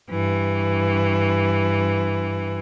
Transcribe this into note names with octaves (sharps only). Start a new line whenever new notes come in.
G2 E3